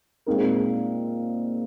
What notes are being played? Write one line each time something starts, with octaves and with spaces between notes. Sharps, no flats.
A#2 G#3 C4 D#4 A#4